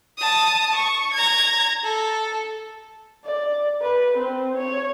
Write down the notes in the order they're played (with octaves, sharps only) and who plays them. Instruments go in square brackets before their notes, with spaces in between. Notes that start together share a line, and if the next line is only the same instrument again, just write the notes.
[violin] A5 D#6
C#6
A#5 G#6
A4
[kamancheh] D5
B4
C4
C#5